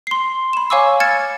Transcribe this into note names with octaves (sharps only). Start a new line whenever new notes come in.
C6 C7
B5 E7
C#5 F5 G#5 C#6 D6 E6
F6 G#6 A6 C#7 E7